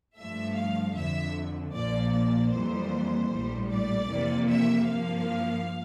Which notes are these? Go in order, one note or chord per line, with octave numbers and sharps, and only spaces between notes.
G2 F3 A3 E5
F5
F2 D3 F3 E5
A#1 A#2 F3 A#3 D5
D5
F2 E3 G3 A#3 C5
A#1 A2 G3
D5
F2 C3 E3 A#3
E5
G2 F3 A#3 F5